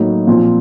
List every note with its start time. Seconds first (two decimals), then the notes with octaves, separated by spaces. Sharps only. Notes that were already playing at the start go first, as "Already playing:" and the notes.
Already playing: A2 F#3 A#3 D#4
0.27 A#2 F3 C4 F4